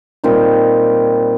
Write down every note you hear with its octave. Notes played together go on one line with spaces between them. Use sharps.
A#2 G3 C4 D#4